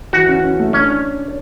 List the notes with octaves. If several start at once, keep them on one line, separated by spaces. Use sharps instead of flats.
E3 F#4
C#4
C#4
A3
C#4 D4